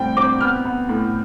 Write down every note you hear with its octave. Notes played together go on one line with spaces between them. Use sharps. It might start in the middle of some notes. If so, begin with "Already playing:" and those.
Already playing: A2 G3 C4 G5
C4 D6
B3 F6
B3
A2